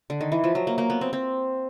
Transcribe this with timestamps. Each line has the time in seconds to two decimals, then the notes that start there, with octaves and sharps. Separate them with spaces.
0.10 D3
0.21 D#3
0.32 E3
0.44 F3
0.55 F#3
0.67 A#3
0.78 A#3
0.90 B3
1.01 C4
1.13 C4